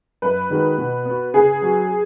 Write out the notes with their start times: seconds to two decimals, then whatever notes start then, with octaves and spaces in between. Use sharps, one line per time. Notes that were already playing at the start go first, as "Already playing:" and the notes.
0.22 F#2 B4
0.50 D#3 G#3 D#4 F#4
0.78 B2
1.06 B3 F#4
1.34 C#3 G#4
1.62 F#3 C#4 F#4